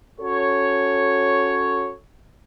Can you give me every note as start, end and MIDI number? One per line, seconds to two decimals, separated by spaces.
0.21 1.92 61
0.21 1.92 66
0.21 1.92 69
0.21 1.92 73